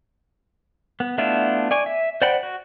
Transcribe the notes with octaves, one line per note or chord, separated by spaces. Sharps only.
B3
A3 B3 D4 E4 F4
D5 G#5 C#6
E5
C5 D5 F#5 G5 B5
F#4